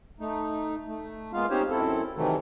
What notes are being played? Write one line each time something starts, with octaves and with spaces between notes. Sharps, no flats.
A3 D#4
A3
G#3 A#3 B3 F4 F5
C4 C#4 D#4 G4 C5 C#5
F#2 C4 E4 A4
C3 D#3 E3 F#3 A3